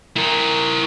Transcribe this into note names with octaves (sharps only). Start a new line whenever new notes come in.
E4 A#4